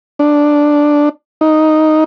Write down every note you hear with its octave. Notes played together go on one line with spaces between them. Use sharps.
D4
D#4